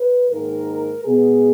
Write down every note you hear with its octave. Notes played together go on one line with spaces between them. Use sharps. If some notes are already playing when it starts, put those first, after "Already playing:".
Already playing: B4
G#2 D#3 A#3 A#4
B2 G#3 B3 G#4